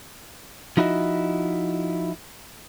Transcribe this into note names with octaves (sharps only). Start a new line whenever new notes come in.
F3 D#4 E4 F#4 D#5